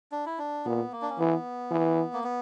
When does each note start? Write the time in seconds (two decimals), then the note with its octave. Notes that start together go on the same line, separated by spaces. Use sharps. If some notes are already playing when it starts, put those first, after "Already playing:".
0.12 D4
0.26 E4
0.38 D4
0.65 A#2 B3
0.92 A#3
1.02 D4
1.10 C#4
1.18 E3 B3
1.71 E3
2.13 A#3
2.24 B3